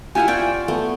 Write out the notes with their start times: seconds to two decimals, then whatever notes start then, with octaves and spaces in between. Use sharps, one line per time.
0.15 E4 F4 G4 E5 F#5 G#5
0.28 F4 D5 G5 C#6
0.68 A3 B3